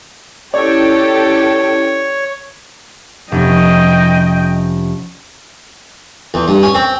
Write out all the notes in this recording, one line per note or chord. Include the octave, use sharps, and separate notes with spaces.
C#4 E4 G4 A4 C#5 D5 G5
F1 C#4 D#5 G5
E2
G2
C#4
C4